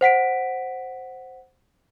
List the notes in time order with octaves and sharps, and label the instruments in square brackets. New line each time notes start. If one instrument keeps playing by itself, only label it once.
[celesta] C5 F#5 B6 D7